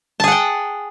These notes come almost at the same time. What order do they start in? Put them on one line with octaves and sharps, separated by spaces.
A5 G#4 F#5 G5